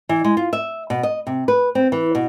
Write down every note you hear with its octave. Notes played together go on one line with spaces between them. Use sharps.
E3
G#3
F4
E5
B2
D#5
C3
B4
C4
E3
B2